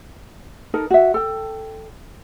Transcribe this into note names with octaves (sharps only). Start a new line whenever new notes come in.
D#4 A4 A#4
F#4 E5
A4 G5